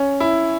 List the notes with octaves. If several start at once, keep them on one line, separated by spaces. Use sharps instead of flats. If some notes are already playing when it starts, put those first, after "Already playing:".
Already playing: C#4
E4